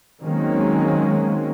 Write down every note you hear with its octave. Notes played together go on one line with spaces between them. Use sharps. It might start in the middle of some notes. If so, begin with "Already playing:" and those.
D#3 F#3 G#3 A#3 C4 C#4